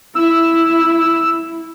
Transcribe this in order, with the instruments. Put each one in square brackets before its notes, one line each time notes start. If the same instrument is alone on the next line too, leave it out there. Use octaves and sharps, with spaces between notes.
[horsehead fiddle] E4 [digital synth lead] E6